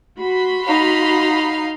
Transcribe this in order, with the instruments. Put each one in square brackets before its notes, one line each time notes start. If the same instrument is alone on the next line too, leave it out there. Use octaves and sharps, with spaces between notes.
[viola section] F#4 B5 C6
[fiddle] D#4 F5